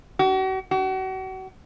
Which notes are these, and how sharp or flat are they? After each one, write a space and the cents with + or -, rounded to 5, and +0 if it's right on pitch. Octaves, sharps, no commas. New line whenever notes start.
F#4 +40
F#4 +35